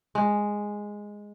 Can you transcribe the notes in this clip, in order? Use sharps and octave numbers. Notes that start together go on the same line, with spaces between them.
G#3